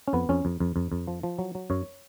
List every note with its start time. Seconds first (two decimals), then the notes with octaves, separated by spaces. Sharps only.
0.08 C#4
0.13 F2 B3
0.29 F2 C#4
0.45 F2
0.60 F2
0.76 F2
0.92 F2
1.07 F3
1.23 F3
1.39 F#3
1.55 F#3
1.70 F#2 C#5